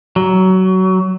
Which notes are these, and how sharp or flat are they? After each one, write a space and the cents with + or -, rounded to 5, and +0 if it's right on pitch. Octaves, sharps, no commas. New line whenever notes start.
F#3 +20